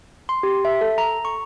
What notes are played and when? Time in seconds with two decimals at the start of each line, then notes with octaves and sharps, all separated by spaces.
0.29 C6
0.43 G4
0.65 E5
0.81 A4
0.98 A#5
1.25 C#6